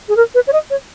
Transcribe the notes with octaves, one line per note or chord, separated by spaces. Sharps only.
G#4
A#4
B4
C#5
D#5
C#5